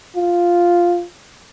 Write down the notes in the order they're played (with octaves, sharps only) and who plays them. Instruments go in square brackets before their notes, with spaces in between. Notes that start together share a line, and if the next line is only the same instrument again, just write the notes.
[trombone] F4